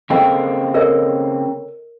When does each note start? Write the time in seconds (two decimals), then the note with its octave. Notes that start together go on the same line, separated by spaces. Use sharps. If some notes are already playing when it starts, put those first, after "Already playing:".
0.10 C#3 A#3 C4 A4 D#5 G5
0.74 A4 A#4 C#5 D#5